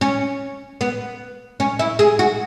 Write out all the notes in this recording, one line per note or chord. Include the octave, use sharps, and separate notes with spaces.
C#4
B3
C#4
E4
G#4
F#4